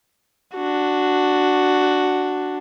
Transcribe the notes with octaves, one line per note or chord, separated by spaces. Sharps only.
D4 F#4